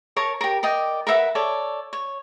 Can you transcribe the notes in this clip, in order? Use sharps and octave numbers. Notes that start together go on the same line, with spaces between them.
A#4 C#5 A5 C#6
G4 A#4
A#4 D5 D#5 G5
A#4 B4 E5 F#5
A4 C#5 D5
C#5